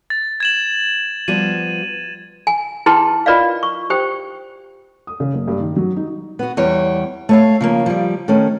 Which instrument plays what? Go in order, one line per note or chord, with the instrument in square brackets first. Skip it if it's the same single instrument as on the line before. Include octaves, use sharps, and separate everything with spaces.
[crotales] A6
G#6 E7 F#7
[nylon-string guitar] F3 G3 B3 [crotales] D#7
[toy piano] G#5
E4 G#4 B4 G5 A5 C6
F4 A#4 B4 D5 D#5 F5
C#6
G4 C5 G5
[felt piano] D#6
C#3
F#1
G2
D#3
F#3
D#4
[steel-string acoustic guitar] B3 F#4
E2 G3 C#5
A3 C#5 F5
C#3 F3 A#3
F3 G3
D#3 A3 C#4